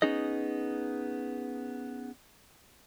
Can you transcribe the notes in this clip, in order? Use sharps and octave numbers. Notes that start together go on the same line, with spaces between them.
B3 C#4 D#4 G#4 D#5